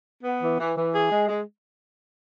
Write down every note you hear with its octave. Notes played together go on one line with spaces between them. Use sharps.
B3
E3
E3
E3
G#4
G#3
G#3